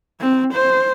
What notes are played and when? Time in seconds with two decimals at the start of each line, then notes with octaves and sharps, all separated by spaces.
0.21 C4
0.54 C5